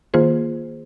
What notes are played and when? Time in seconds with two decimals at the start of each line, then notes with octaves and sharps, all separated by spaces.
0.14 D#3 A#3 F4 G#4 C5